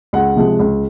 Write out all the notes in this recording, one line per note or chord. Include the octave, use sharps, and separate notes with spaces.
C#2 F#5
C3 F3 G#3
C#2